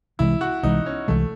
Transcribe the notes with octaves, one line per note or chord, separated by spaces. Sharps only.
C2 C3 E3 G#3 E4
F#4
C2 C3 E3 G#3 D#4
C#4
C2 C3 E3 G#3 A3